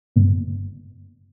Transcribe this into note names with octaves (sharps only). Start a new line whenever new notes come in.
G1